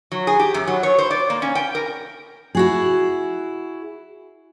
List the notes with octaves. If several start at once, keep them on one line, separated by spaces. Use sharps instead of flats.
F#3
G#4
G4
F#2
F#3
C#5
C5
D5
A#3
C#4
G5
A#4
E4 F#4 G#4